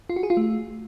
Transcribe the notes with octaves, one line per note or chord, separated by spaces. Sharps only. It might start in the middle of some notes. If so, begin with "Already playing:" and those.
F4
F#4
G#4
F4
A3